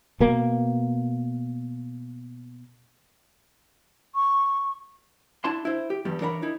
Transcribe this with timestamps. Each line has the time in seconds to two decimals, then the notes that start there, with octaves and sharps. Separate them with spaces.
0.20 B2 A#3
4.15 C#6
5.44 D4 E4 A5 C6
5.65 E4 C5
5.90 G4
6.05 E2 G2 G3
6.21 E3 D4 A#4 C#5 F5 B5
6.42 D#4 E4